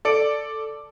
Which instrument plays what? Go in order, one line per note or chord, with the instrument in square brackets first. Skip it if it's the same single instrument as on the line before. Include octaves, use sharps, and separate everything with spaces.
[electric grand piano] A4 D5 C#7 D7